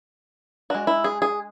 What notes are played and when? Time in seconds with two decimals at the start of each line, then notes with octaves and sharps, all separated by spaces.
0.70 G#3 D4 F#4
0.87 E4
1.04 G#4
1.22 G#4